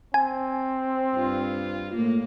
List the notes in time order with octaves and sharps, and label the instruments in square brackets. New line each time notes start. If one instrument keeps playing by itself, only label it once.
[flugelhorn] C4 [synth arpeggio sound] G#5
[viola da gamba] G2 F4
A2 A#3